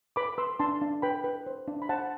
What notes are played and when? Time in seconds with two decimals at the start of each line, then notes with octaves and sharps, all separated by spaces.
0.16 B4 B5 D6
0.38 B4 C6 E6
0.59 D4 A5 C6
0.81 D4
1.02 B4 G5 B5
1.24 B4
1.46 C5
1.68 D4
1.82 B5
1.89 C5 F#5 A5